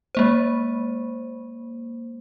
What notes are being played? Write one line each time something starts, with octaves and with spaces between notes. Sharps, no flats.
G#3 A#3 C5